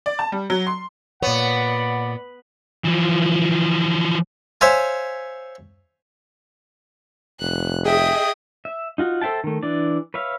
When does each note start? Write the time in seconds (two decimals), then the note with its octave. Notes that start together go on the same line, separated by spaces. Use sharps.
0.06 D5
0.19 A5
0.32 G3
0.50 F#3
0.67 C6
1.23 A#2 B3 C#5 D5 F#5 B5
2.85 E3 F3
4.61 C5 C#5 E5 F5 G#5
7.41 F1 F#6
7.85 G#4 D#5 E5 G5 D#6
8.65 E5
8.98 D#4 F4 F#4
9.22 A4 C5 E5 G5 A5
9.44 D#3 A3
9.63 E3 D4 D5
10.14 B4 C#5 E5 F5